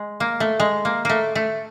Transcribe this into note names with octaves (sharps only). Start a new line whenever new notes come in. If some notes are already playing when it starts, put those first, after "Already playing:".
Already playing: G#3
A#3
A3
G#3
A#3
A3 A#3
A3